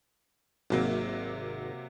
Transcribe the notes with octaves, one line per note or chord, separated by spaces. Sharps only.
G#1 C3 F#3 A#3